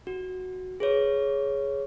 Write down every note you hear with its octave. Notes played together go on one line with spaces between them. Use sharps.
F#4
G#4 B4 C#5